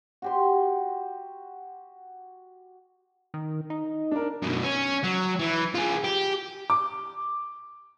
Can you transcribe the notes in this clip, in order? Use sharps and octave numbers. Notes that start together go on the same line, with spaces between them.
F#4 G4 C6
D#3
D#4
D4 A#4
F#2 B2
C#4
F#3
E3
F4 G#4
G4
D6